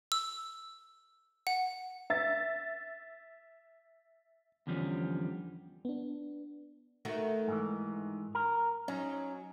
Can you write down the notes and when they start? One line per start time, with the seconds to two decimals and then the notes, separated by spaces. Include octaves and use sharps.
0.12 E6
1.47 F#5
2.10 E5 A6
4.67 E2 D3 F3 G3 B3 C#4
5.85 B3 D4
7.05 D#3 A3 F#4
7.48 G#2 E3
8.35 A#4
8.88 F#3 C#4 D#4